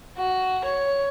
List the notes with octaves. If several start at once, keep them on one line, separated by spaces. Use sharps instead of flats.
F#4
C#5